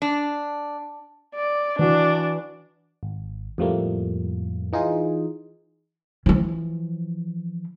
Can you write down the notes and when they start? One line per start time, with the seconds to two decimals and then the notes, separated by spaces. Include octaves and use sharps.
0.02 D4
1.35 D5
1.79 E3 D4 F#4
3.03 G#1
3.58 F2 A2 F3 G3 A3 A#3
4.73 E3 D#4 F4 G#4
6.26 E3 F3